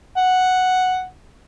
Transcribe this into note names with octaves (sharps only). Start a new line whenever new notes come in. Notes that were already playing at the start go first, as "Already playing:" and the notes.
F#5